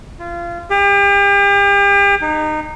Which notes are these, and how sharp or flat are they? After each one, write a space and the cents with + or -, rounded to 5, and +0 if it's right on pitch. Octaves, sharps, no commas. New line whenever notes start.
F4 -25
G4 +40
D#4 -20